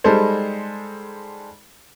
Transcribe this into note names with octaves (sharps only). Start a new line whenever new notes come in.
G3 G#3 D#4 A4 C5